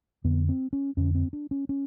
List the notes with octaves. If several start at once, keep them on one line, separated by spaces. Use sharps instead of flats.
F2 D3 B3
C4
C#4
F2 D3 C#4
C4
D4
C#4
C#4